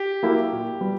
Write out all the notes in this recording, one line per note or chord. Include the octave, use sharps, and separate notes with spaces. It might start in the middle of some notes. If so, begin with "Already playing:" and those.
Already playing: G4
F#3 A#3 E4
A#2
G3 B3